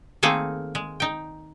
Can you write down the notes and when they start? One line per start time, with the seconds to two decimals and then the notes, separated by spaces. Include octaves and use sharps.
0.23 D#3 A3 A#3 C4 G#4
0.75 G#3
1.00 D#4 G5